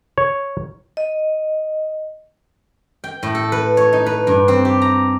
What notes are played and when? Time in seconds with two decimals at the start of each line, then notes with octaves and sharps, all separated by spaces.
0.18 C#5
0.97 D#5
3.04 G5
3.23 A2
3.35 A4
3.52 B4
3.77 C#5
3.93 D#4
4.06 B4
4.27 G2
4.48 C4
4.65 G4
4.82 A#5